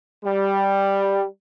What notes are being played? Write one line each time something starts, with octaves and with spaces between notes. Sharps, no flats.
G3